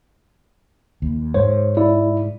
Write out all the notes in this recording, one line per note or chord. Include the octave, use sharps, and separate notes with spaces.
D#2
G#2 C5 C#5
E4 D5